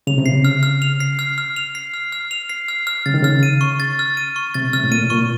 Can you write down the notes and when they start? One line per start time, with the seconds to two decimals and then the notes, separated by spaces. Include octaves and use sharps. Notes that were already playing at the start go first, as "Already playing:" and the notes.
0.07 C#3 F7
0.18 C3
0.26 C#3 C7
0.45 F6
0.63 F6
0.82 F7
1.00 C7
1.19 F6
1.38 F6
1.56 F7
1.75 C7
1.94 F6
2.12 F6
2.31 F7
2.49 C7
2.68 F6
2.87 F6
3.06 C#3 A6
3.14 D#3
3.22 C#3 F6
3.43 D#7
3.61 C#6
3.80 A6
3.99 F6
4.17 D#7
4.36 C#6
4.54 C3 A6
4.73 C3 F6
4.84 A2
4.92 A#2 D#7
5.10 A#2 C#6